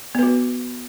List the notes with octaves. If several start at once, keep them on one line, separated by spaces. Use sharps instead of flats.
B3 F#4 B4